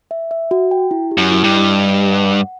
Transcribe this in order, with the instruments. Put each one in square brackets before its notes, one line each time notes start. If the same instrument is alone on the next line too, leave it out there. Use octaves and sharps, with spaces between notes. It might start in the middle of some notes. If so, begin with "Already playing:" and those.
[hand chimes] E5
E5
F#4
G5
E4
G4
[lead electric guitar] F#2
[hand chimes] E4
[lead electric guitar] G2
[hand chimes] D#5
G4
D#5
F#5
F#5